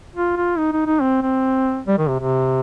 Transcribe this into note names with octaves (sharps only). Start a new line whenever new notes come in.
F4
F4
D#4
D#4
D#4
C4
C4
G3
D#3
C3
C3